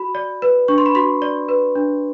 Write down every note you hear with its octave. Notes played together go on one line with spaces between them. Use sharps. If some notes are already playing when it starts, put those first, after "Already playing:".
Already playing: F#4 B5
D5
B4
D4 C#6
C6
B5
F#4 C6
D5
B4
D4